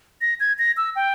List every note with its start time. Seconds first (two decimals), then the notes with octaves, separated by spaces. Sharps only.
0.21 A#6
0.40 G#6
0.59 A#6
0.77 E6
0.96 G5